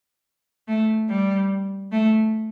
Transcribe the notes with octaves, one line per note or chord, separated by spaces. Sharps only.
A3
G3
A3